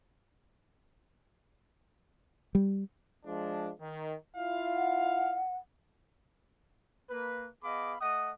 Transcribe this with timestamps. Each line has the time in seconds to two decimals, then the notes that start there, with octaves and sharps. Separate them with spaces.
2.55 G3
3.25 F3 G#3 D4
3.81 D#3
4.37 E4 F4 F5
4.75 F#5
7.10 A#3 B4
7.62 B3 G#4 D#5 F5 B5 D6
8.00 A3 D#5 F#5 D#6